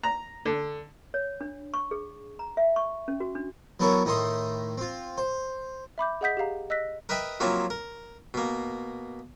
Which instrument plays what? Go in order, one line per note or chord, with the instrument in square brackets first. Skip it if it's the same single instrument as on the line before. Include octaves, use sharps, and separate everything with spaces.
[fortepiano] A#5
D3
[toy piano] C#5
D4
C#6
G#4
A#5
E5
C#6
C#4
F#4
D4
[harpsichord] F#3 B3 E4 A4 A#4 C#5
A2 D#3 D#4 E5 C6 D#6
C4 F4
C5
[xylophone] E5 B5 D6 G6
G#4 D#5 F#5 D#6 G6 B6
G4 G#4 F5 A#5
D#5 E6 F#6 A#6 B6
[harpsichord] A#4 B4 D#5 E5 G5 B5
F3 F#3 A#3 C4 E4 F4
A#4
B2 A#3